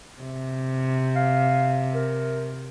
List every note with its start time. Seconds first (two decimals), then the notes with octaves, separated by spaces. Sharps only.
0.21 C3
1.16 F5
1.94 A#4